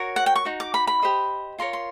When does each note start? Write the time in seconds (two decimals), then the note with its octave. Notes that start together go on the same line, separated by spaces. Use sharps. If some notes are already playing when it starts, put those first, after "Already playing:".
Already playing: F#4 A#4 C#5
0.16 F#5
0.26 G5
0.35 C#6
0.45 D#4 F#4
0.60 D6
0.74 B5
0.87 B5
1.02 G4 C5 D#5
1.59 F4 A#4 C#5 C6
1.73 C6